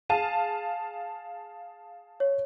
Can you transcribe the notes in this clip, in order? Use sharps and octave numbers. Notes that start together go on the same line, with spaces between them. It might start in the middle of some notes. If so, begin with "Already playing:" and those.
G#4 F5 A5 D#7
C#5